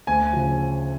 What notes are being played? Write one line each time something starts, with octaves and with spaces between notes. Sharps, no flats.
D2 G#5
C#3 F3